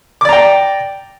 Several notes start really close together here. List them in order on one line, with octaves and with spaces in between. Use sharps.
D6 D5 A#5 G5